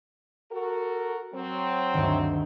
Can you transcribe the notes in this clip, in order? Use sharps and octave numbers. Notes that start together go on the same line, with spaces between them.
F#4 A4 A#4
F#3 C4
D2 G2 D#3